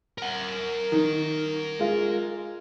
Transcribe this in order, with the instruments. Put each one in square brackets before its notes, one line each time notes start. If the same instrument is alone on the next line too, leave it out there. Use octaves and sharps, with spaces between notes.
[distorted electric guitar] A#4 F#5
[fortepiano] D#3
G#3 F4